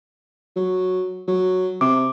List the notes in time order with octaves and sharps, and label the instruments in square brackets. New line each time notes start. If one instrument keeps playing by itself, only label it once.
[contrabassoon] F#3
F#3
[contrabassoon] C3 [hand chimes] D6